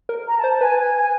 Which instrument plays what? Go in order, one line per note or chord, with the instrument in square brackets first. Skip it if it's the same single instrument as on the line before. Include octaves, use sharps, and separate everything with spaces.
[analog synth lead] A#4
[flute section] A#5
A5
[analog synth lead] C5
[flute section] A5
[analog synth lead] B4 [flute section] G#5
[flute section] G#5
G#5